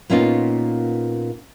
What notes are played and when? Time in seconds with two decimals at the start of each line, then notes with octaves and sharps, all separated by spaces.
0.10 A#2 A#3 B3 C#4 D#4 F4